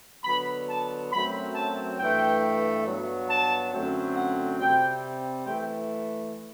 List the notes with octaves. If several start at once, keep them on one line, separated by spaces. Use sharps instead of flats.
D3 F#3 B3 B5
A5
F#2 F#3 A3 C4 B5
A5
G2 E3 A3 G5
G2 F#3 B3
A5
F#2 D3 F#3 A3 C4
F#5
C3 G3 C4 G5
E3 A3 G5